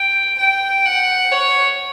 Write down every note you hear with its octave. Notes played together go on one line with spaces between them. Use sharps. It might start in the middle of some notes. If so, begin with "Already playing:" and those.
Already playing: G5
G5
F#5
C#5